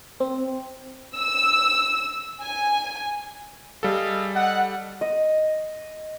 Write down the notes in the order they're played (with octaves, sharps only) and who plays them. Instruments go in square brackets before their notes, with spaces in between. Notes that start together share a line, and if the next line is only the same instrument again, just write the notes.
[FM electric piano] C4
[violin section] E6
G#5
[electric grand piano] G3 A4 [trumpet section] G#4 D#5 F5
[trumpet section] D#5 F#5
[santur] D#5